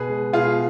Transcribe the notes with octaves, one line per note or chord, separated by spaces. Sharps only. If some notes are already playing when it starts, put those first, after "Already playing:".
Already playing: B2 G#4 B4
G#3
B2 F4 G#4